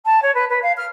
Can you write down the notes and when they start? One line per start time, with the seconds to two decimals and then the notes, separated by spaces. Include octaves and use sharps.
0.05 A5
0.22 C#5
0.34 B4
0.49 B4
0.62 F5
0.77 F6